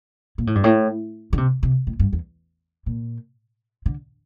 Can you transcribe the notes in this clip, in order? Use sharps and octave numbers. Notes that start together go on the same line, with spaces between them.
A#2
A2
G2
A2
D3
C3
C3
A2
G2
E2
A#2
D3